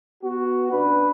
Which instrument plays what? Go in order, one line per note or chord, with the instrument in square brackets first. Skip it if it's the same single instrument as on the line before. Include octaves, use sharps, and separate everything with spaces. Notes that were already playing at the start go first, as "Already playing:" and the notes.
[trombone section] B3 F#4
C#3 D4 B4